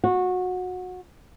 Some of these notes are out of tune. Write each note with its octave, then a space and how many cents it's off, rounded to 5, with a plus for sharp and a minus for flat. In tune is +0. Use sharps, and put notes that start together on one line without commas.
F#4 -20